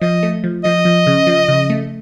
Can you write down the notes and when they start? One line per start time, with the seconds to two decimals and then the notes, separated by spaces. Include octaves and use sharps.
0.01 F3 D#5
0.23 A3
0.44 F3
0.64 F3 D#5
0.85 F3
1.07 C#3
1.27 F3
1.48 C#3
1.70 A3